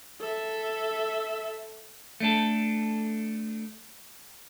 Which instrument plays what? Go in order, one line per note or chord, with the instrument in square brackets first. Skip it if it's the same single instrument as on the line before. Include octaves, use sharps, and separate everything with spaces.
[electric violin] A4 E5
[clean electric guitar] A3 D4 A4